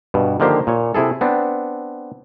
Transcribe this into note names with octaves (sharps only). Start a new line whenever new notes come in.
G2 B2
D3 D#3 F3 A#3 G4 C5
A#2 C#5
C3 E4 G#4 A4
B3 C4 D4